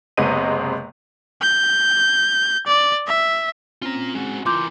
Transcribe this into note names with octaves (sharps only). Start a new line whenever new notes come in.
F#1 C3 G#3 B3 D#5 D#7
G6
D5
E5
C4 C#4 F4 A#5
G#3 F#4
E3 F4 A#4 C6 D6 G6